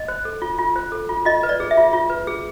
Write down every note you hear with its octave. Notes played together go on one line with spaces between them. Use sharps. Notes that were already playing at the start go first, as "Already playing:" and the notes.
Already playing: D#5
C5
A4
F4
F4
C5
A4
F4
F4 D#5
B4
D5
G#4
E5
F4
F4
B4
G#4